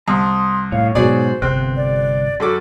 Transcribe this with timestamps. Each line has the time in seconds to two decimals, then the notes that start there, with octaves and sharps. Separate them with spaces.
0.08 C2 A5 C6 D#6
0.72 A2 C#5 F5
0.95 G#2 B2 F#3 G#4 C5 D5
1.42 G1 C3 C4 F#6
1.76 D5
2.40 F#2 F#3 A4 D6